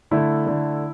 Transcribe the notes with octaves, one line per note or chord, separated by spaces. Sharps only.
D3 A3 E4
D3 A3